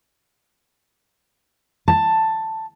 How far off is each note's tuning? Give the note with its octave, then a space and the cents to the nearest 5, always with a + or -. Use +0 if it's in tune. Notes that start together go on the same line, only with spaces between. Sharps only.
A5 +10